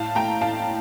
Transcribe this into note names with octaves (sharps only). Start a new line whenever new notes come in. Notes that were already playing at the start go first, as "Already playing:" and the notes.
Already playing: A2 F5 A5
A3 G5 A#5
A2 F5 A5